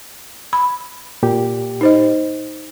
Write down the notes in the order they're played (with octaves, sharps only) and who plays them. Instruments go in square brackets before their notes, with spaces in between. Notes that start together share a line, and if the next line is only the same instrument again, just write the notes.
[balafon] B5
[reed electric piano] A#2 G4
[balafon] D#4 C5 D#5